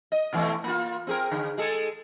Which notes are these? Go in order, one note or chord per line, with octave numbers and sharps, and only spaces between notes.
D#5
B2 E3 A3
A#3 F4
C4 G#4 A#4
D3
G#3 G#4 A4